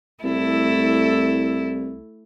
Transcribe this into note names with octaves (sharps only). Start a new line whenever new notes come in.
C2 A3 E4 A4